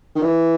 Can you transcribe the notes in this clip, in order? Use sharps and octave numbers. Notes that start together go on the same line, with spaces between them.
D#3
E3